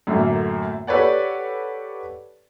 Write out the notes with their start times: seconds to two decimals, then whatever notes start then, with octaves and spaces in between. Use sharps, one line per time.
0.07 F#2 A2 D3 A3 A#3
0.87 G4 A4 B4 C#5 D5 F#5